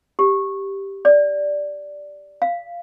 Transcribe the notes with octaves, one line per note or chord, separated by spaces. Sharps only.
G4
D5
F5